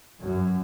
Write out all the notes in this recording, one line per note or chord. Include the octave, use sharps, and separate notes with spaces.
F#2